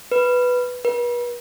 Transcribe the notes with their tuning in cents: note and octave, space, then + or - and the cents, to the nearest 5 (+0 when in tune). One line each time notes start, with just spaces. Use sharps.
B4 +0
B4 -40